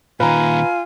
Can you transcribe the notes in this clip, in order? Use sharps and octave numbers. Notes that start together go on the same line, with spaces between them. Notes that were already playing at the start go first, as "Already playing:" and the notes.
A#2 D#3 F4 B4 G#5 A#5